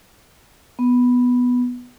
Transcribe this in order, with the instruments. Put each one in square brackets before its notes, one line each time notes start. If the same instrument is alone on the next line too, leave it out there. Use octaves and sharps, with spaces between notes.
[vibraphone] B3